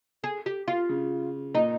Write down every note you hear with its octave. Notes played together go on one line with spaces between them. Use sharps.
G#4
G4
F4
C#3
A#2 D#4